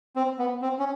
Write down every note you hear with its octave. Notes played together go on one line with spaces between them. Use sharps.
C4
B3
C4
C#4